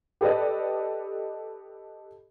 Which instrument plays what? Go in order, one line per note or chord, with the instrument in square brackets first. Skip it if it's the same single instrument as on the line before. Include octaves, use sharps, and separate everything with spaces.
[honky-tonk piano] G4 A4 B4 D5 D#5